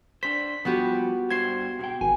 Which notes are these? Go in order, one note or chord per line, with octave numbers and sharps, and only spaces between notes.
D4 C5 B6
F3 G3 B3 F#4 G4
G2 C5 G#6 C7
B2 G5
G#1 G#5